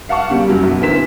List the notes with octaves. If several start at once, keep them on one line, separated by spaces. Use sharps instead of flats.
F5 F#5 A5 C#6
C#3 G3 A#3
F#2 F#3
B1
D3 E3 C4 A#4 B6 E7